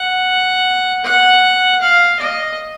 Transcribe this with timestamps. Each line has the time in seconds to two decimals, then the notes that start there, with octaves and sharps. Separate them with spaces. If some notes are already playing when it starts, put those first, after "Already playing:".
Already playing: F#5
1.04 F#5
1.81 F5
2.20 D#5